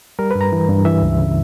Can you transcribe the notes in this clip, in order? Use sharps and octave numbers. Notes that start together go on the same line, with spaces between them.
G3 A#4
G2 B4
A#5
E3
G2
E3 E5
C#2
C#3